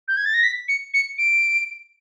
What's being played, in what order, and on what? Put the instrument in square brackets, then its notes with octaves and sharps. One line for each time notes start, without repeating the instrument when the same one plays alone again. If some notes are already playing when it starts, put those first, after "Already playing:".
[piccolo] G6
G#6
A6
A#6
B6
C#7
C#7
D7